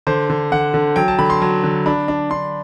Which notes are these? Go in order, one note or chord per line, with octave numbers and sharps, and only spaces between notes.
D3 C5
D3
D3 F#5
D3
F#3 G5
A5
D3 B5
C6
F#3
D3
D4 B5
D4
D4 C6